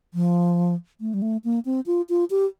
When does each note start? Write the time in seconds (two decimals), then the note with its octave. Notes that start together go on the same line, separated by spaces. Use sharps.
0.14 F3
1.01 A3
1.14 G3
1.22 A3
1.44 A#3
1.65 C4
1.86 F4
2.09 F4
2.30 G4